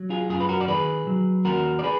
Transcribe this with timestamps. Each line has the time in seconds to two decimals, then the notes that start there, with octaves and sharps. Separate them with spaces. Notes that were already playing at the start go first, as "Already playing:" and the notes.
Already playing: F#3
0.10 F4 G#4
0.29 F#2 F4 G#4
0.40 B4
0.49 F#4 A#4
0.61 D5
0.68 D#3 G#4 B4
1.07 F#3
1.45 D#2 F#4 A#4
1.79 D5
1.84 G#4 B4